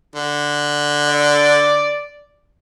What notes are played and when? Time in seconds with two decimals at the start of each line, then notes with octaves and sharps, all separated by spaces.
0.15 D3
1.07 D5